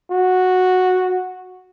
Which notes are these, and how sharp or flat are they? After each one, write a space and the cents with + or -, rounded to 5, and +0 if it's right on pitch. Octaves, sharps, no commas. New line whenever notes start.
F#4 -5